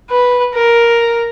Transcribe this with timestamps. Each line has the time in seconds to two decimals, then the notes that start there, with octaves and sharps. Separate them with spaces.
0.10 B4
0.55 A#4